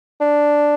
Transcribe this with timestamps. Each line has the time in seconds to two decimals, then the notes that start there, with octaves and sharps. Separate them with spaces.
0.21 D4